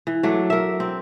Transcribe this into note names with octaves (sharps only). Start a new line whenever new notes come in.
E3
F#3 A3 D4
A#4 E5
C4